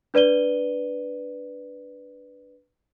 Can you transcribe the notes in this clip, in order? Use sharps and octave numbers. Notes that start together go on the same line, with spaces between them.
D4 B4 D5 D#7 G7